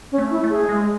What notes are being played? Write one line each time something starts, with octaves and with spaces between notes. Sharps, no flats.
C#4
A3
E4
A3
G#4
G#3